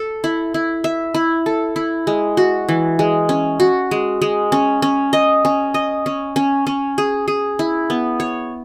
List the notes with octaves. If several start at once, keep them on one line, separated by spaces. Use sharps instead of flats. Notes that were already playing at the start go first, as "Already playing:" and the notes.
Already playing: A4
E4
E4
E5
E4
A4
E4
G#3
F#4
E3
G#3
C#4
F#4
G#3
G#3
C#4
C#4
D#5
C#4
D#5
C#4
C#4
C#4
G#4
G#4
E4
B3
C#5